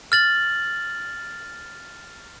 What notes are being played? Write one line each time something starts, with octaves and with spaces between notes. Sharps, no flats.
F6 A6 F#7